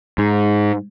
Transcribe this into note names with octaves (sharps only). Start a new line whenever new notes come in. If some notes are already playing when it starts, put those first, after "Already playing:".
G#2